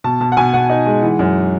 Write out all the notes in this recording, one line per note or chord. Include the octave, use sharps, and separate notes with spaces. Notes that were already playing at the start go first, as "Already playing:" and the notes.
B2 A5
B2 A5
F#5
B2 G#5
B2 F#5
D#4
G#3
E3
F#2